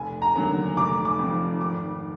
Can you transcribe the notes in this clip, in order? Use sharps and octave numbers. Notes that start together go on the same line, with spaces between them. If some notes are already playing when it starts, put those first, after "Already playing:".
Already playing: F1 G#5
A#5
D#2 D3 F#3 A#3
F1 D6
D6
F2 F3
G#1 D6